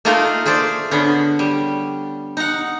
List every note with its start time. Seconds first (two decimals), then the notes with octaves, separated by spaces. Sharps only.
0.05 A3 A#3 D#4 F4 G#4 A#4
0.46 A3 G#4 C5 D5
0.91 D3 B3 C#4
1.39 G3
2.37 D#4 F#5